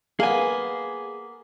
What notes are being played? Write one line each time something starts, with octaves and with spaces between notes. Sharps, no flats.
A#3 B3 G#4 G#5